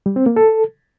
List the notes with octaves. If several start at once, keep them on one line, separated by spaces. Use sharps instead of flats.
G3
C4
A#3
A4